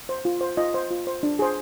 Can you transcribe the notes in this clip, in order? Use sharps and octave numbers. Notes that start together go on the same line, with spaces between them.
C5
F4
C5
F4 D#5
C5
F4
C5
D4
G#4 C5